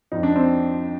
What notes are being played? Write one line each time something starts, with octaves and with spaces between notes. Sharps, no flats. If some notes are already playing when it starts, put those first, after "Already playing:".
F2 D#4
D4
C4